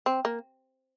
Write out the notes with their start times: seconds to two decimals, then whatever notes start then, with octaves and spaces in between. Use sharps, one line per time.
0.06 C4
0.25 A#3